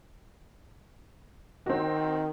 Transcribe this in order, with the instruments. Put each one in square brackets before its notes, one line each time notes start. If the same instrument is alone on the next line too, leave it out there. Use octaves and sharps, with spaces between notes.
[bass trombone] D#3 [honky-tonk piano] C4 F#4